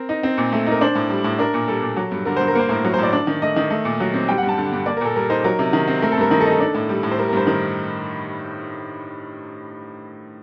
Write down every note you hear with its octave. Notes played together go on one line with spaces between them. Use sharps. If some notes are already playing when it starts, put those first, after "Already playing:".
Already playing: C4 A#4
D#4
C4
A#2
A3
D#4 A#4
D4 C5
A2
G3
A2
D4 A#4
A#2
G3 A4
A#2
F#3
G2
D3 A#4
G2 C5
A#4
A#3 C5
A2 A#4
F#3 A#4
C5
A2 D5
D4
D#3
A3 D#5
D#3
A3
A#2
F#3
C4
G3 G5
F#5
G2
A5
D3
G2
A#3 D5
A#4
A#2 A4
G3 A#4
D#4 C5
F#3 A#4
C3
D#3
C4
A3 A#4
A4
G2 A#4
D#3 A#4
A4
D#4
A4
D4
A2
G3
A2
C5
G3 A#4
A#4
G2 C5
D#3 A#4